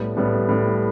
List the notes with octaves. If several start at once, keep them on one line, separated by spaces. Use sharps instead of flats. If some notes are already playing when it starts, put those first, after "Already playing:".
Already playing: A2 G3 B3
A2 G3 B3
A2 G3 B3